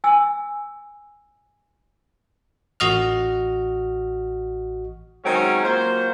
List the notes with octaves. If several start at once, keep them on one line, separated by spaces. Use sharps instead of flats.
G#5 E6
A1 F#4 D#5 F6
D#3 F#3 G#3 C4 C#4
F#3 A#3 F4 C5